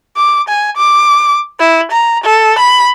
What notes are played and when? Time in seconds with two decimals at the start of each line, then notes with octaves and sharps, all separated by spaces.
0.17 D6
0.49 G#5
0.77 D6
1.59 E4
1.92 A#5
2.24 A4
2.59 B5